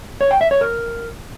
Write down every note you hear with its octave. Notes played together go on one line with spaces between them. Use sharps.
C#5
G5
E5
C#5
A#4